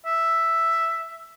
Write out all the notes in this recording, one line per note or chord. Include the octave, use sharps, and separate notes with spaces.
E5